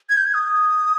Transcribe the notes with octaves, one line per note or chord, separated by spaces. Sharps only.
G#6
G6
G#6
D#6